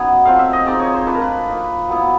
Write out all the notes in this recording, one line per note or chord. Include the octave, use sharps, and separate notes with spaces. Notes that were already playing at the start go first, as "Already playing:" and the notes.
Already playing: F#3 B3 C#4 D#4 F#5 G#5
A3 C4 F4 F5
E5
D#5
G#3 C4 D#4 D5
C#5
C5
A3 D4 F4 B4
A#4
B4
A#3 D#4
F#3 B3 E4